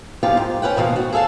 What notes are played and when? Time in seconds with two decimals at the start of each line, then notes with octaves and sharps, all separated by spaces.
0.23 F#2 F3 B3 F4 G4 F5
0.37 G#2
0.62 C#4 B4 F#5 G5
0.76 D2 B2 D#3 F3 F5
0.96 F#4
1.13 G#4 A4 D#5 F5 A5